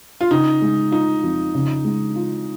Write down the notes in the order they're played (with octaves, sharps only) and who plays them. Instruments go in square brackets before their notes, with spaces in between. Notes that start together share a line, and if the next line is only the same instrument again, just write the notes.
[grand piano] F4
[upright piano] C#3 [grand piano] D#4
[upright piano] G#3
[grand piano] D#4 [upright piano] F4
[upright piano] F2
C#3
G#3
F4